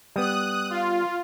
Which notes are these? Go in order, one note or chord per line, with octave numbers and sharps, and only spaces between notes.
G3 B3 D#6 F#6
F4